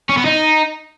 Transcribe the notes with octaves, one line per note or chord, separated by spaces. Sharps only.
C#4
B3
D#4